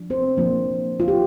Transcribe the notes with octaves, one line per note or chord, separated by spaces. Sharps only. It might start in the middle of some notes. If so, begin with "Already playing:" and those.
Already playing: F3 D4
C4 C5
F3 A#3 D4
F4
G4